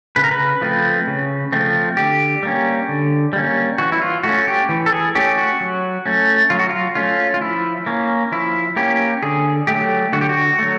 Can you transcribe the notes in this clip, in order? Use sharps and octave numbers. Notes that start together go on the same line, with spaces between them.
C#3 B4
A#4
B4
F3 A3 C4
C#3
F3 A3 C4
D3 G4
G3 A#3 C#4
D3
G3 A#3 C#4
E3 F#4
E4
F4
A3 C#4 F#4
G4
E3
A4
G#4
A3 C#4 G4
F#4
F#3
A3 C#4
F#3 F4
F#4
F4
A3 C#4 F4
F4
F3 E4
A#3 C#4
F3 E4
A#3 C#4 G4
D3 G#4
F#3 A3 G4
D3 F#4
G4
F#4
F#3 A3